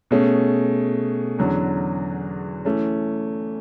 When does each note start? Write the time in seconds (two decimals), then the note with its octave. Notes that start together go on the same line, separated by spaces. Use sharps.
0.11 B2 A3 C#4 G#4
1.38 E2 D3 F#3 C#4
2.65 E3 A3 C#4